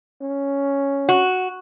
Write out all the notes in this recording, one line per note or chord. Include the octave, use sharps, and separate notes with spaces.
C#4
F#4